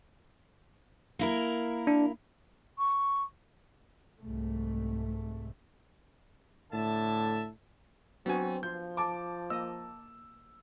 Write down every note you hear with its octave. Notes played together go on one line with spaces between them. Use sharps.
A#3 E4 A#4
D4
C#6
C2 G#2 A3
A2 D3 E5 A5
F#3 B3 C4 D4 F#4 G#5
F3 F4 G6
A5 D6
A#3 D#5 E6